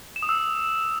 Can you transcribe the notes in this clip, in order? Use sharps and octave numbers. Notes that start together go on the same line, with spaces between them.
E7
D#6
E6